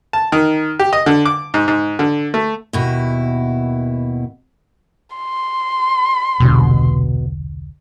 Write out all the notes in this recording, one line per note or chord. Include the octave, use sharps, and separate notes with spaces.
A5
D#3
G4
D#5
D3
D6
G#2
G#2
D3
A3
D#2 B2 E4
C6
E1 C2 B2 D3